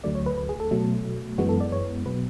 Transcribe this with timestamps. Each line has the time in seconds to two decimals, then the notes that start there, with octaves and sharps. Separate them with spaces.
0.04 D2 D3 F#3 A3 D5
0.15 C#5
0.26 B4
0.38 B4
0.49 G#4
0.60 A4
0.71 B2 F#3 A3
1.38 F#2 E3 G#3 B3 F#4
1.49 A4
1.61 D5
1.72 C#5
2.06 B2 F#3 B3 B4